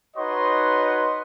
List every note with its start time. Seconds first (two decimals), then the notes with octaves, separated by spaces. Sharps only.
0.17 D#4 F#4 B4 C#5 D#5 C6